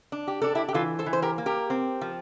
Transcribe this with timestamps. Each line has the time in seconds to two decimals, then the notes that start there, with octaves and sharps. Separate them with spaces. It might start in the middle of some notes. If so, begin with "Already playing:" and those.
0.12 D4
0.27 G4
0.42 D4 A4
0.55 E4 G4
0.68 G4
0.74 E3 F4 A4
0.99 A4 C5
1.06 E3
1.13 C5
1.22 G4 A#4
1.38 A#3
1.46 G4 A#4
1.70 C4
2.01 F3